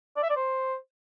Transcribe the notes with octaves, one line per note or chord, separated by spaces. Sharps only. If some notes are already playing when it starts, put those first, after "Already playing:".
D5
E5
D5
C5